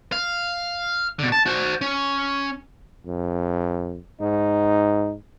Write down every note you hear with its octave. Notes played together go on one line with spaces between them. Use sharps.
F5
B2 D3
A5
F#4 C5
C#4
F2
G#2 D#4